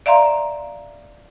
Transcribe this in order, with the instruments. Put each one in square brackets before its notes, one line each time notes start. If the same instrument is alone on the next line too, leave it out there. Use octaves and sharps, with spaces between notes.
[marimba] D5 E5 F5 A#5 C6